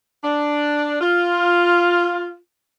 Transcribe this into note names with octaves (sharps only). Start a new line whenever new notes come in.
D4
F4